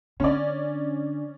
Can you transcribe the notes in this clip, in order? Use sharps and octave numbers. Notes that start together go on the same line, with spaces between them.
D3 C#4 D5